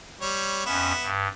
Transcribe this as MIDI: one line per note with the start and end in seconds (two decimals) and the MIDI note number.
0.22 0.63 55
0.22 0.63 73
0.66 0.92 41
0.66 1.09 59
0.66 0.92 61
0.66 1.09 76
1.02 1.28 43